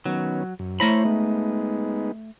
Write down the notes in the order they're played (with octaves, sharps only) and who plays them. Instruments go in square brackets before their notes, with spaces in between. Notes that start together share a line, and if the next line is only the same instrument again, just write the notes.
[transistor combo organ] D#3 B3 C#4 [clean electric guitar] F#3
[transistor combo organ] F#2
[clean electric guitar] A3 A#5 B5 [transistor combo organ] E4 C5 C#5
[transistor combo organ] G#3 B3 D#4